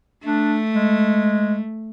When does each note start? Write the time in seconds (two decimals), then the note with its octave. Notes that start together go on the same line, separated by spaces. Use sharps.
0.24 A3 D4
0.74 G#3